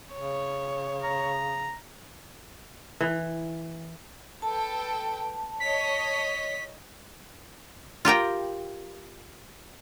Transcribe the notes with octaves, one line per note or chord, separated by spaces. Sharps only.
C#3 C#5
A#5
E3
A4 B4 G5 A5
C#5 D#5 B6
F4 G4 A#4 G5